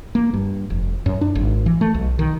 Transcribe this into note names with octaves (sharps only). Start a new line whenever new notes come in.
A#3
G2
F1
F#2
D4
G#1
E3
A3
B1
D#3